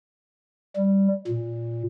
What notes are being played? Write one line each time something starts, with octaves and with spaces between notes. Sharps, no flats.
G3
A#2